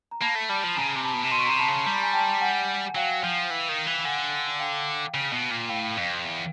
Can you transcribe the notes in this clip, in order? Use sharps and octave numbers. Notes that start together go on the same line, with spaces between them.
A#5
A#3 A5 B5
A3
G3 A5 B5
F3
C#3 G#5 A#5
C3
A5 B5
B2
C3
B2 C6
C#6
C3 A#5 C6
A5 B5
C#3
G3 A#5
B5
G#5 A#5
G5 A5
F#5 G#5
F#3 F5 G5
F3
E3
D#3
E3
D3 F#5 G#5
F5 G5
C#3
B2
A#2
A2 F5 G5
F2
E2